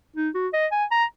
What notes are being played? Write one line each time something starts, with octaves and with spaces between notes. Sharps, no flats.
D#4
F#4
D#5
G#5
A#5